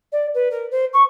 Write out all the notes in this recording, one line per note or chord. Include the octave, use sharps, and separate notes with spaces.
D5
B4
A#4
C5
C#6